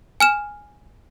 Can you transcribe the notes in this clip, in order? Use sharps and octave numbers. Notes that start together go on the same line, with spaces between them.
G#5 F6 E7